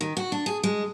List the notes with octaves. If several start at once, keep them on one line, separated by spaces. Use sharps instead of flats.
D#3
F#4
D4
G#4
G#3